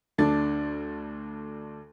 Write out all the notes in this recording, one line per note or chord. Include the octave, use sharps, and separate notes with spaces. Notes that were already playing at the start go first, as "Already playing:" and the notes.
D2 D4 A4 A6